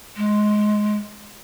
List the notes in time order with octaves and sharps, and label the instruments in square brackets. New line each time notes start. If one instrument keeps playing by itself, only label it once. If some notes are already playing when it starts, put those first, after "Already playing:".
[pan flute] G#3